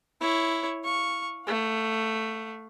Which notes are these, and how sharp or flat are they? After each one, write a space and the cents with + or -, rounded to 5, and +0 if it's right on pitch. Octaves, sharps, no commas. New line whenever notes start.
E4 +0 C#5 +0
F5 +5 C#6 -5
A3 +10 F5 +40